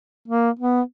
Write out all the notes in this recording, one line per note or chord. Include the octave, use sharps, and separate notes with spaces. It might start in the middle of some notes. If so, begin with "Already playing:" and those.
A#3
B3